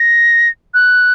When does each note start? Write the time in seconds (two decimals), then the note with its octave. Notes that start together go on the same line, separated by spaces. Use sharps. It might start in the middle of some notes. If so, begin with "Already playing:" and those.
Already playing: A#6
0.74 F#6